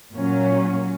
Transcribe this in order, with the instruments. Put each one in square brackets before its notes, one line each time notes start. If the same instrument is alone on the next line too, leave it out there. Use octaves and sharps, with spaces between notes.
[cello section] A#2 F#3 C#4